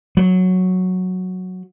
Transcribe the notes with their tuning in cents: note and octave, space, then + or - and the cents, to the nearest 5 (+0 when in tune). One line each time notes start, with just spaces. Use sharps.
F#3 -5